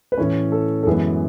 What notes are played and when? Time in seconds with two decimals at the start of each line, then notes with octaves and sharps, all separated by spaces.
0.12 B4
0.18 A2 E3 A3 C#4 C#5
0.52 A4
0.83 A4
0.86 F#2 E3 G#3 B3 G#4